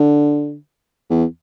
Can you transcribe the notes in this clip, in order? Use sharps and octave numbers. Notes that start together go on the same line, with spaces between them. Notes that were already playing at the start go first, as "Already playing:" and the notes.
Already playing: D3
E2